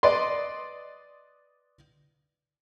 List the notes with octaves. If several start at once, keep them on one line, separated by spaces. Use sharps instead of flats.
B4 D5 D#5 C6